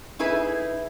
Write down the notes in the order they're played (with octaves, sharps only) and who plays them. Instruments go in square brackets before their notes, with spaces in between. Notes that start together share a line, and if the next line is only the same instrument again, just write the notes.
[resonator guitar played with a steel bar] D#4 E4 G#4 B4